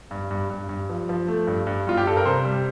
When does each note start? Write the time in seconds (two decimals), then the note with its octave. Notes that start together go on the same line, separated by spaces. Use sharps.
0.11 G2
0.31 G2
0.50 G2
0.69 G2
0.90 F3
1.09 F3
1.28 A3
1.47 G2
1.67 G2
1.87 G2 F4
1.97 G4
2.07 G2 A4
2.17 A#4
2.26 C3 C5
2.45 G3